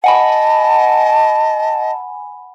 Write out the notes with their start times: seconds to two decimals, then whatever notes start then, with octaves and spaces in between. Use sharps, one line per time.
0.04 D#5 F#5 G#5 A5 B5